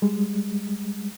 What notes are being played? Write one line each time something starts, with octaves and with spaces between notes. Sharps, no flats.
G3 G#3